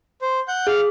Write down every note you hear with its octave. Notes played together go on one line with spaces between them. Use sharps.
C5
F#5 G6
G#4 F5